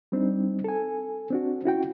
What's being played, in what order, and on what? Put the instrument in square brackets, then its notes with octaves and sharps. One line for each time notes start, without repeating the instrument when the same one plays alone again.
[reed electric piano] G3 C4 D4 D#4
A4 G#5
C4 D4 F#4
C#4 E4 F#4 G5